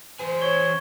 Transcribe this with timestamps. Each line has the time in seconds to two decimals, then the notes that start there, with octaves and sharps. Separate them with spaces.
0.19 E3 G4 C5 G#5
0.41 C#5 G#6 G7